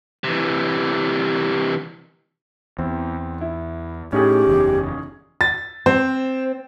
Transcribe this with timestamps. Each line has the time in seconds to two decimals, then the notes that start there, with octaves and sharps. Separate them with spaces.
0.24 C3 E3
2.78 E2 C4
3.41 E4
4.13 A2 C#4 D#4 G4 G#4
4.47 F#1 E2
5.41 A6
5.86 C4 C5